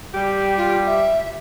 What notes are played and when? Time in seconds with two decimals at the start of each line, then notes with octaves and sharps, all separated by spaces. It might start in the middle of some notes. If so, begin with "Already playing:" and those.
0.14 G3 G4
0.57 F4
0.87 E5